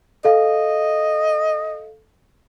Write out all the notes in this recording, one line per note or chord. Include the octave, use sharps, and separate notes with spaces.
A4 D#5 F5